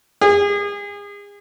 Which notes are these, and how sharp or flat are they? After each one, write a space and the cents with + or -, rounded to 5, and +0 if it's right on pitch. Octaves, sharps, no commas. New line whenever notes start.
G#4 -35